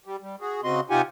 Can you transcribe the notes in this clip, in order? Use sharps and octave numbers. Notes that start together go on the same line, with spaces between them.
G3
G3
F#4 G#4
C#3 C4 F#4 D#5 C6
C3 D#4 F4 G4 F#5 G#5